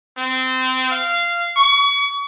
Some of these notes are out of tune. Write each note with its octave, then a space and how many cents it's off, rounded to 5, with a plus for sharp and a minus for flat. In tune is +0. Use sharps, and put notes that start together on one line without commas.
C4 -20
F5 -15
C#6 +35